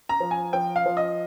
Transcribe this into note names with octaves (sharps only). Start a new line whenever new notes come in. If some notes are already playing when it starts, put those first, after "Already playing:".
A#5
F3
G#5
F3 G5
F5
F3
D#5